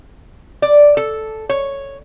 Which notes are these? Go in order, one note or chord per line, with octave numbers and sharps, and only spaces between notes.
D5
A4
C#5